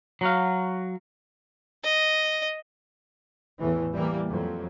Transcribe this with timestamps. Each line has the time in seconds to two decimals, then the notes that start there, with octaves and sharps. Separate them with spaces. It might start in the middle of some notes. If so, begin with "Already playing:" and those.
0.21 F#3 F#4 F5
1.84 D#5
3.59 E2 A2 E3
3.92 E3 G3 A#3
4.27 F2 F#3